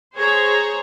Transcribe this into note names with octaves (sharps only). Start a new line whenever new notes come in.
G#4 C5 C#5 A#5